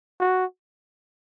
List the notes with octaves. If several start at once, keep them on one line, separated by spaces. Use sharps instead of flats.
F#4